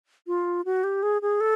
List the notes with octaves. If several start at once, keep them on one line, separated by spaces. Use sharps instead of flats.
F4
F#4
G4
G#4
G#4
A4